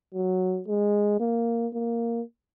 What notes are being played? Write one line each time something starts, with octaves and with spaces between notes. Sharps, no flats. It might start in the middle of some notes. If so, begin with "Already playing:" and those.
F#3
G#3
A#3
A#3